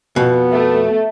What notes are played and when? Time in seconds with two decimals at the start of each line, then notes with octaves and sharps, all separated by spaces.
0.16 F2 B2 B3
0.52 A3 E5